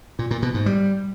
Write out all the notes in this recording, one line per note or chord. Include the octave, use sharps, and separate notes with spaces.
A#2
A#2
B2
G#2
G3